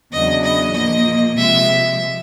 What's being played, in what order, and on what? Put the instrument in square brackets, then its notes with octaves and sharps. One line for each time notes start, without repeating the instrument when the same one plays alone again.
[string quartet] E2 C#3 F#3 B3 D4 [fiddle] D#5
[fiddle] D#5
[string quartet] A#2 F3 A#3 [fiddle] D#5
[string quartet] C3 F3 G#3 [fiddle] E5